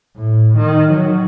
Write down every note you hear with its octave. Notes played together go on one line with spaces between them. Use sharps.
A2
D#3
F#3